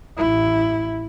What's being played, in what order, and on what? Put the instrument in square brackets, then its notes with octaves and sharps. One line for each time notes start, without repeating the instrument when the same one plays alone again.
[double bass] A1 E4